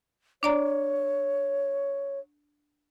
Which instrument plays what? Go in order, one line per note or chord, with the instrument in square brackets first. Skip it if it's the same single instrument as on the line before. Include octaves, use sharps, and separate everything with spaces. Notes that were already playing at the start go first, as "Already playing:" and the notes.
[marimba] D4 D5 A#5 [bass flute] C#5